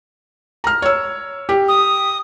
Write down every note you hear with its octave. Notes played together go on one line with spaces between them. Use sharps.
A#5 F6
C#5 E6
G4
D#6